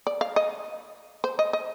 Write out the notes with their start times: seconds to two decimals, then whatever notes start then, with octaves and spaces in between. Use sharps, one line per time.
0.07 D5
0.21 F5
0.36 D#5
1.24 C5
1.39 D#5
1.53 D#5